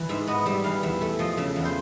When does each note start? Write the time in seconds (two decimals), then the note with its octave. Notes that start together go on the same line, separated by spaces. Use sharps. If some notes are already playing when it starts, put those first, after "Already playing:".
Already playing: E3
0.09 G#2 E5
0.27 B3 D#5
0.46 G3 E5
0.64 E3 F5
0.83 E2 E5
1.01 A3 E5
1.19 F3 D#5
1.37 C#3 E5
1.56 E2
1.65 C5